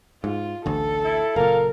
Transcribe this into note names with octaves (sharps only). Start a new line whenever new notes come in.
G#2 F4
A1 D2 A4
E4
F#1 A#2 A#4 F5